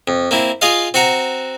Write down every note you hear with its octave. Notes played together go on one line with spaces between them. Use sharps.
F2
A#3 C4 E4
F4 G#4 D#5 F5
C4 F#4 F#5 A#5